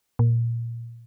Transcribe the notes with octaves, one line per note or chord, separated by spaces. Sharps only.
A#2